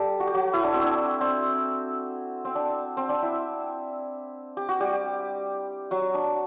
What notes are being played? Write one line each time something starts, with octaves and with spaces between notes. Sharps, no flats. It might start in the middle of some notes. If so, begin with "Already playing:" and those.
Already playing: G3 G4 A4
F#4
G4
F#3 F#4
E4
D4
C4
D4
C4
C4
D4
C4
D4
E4
G4
F#4
G3 G4
F#3 F#4
D4